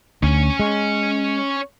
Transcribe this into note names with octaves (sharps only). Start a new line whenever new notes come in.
D2 C#4 G#5
G#3